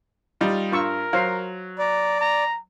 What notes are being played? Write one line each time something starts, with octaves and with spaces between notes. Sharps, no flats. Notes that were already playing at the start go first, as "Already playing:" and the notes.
G3 D#4 F4
G2 F4 A#4 C#6 E6
F#3 C5 F5
D5 A#5
A#5